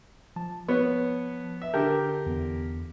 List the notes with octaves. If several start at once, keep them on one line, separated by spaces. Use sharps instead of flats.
F3 A5
B3 C#5
E5
D3 G4 A#4 A5 G6
E2